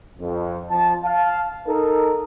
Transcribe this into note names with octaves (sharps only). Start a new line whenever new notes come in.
F2
F3 A5
F5 A5
D#4 A4 A#4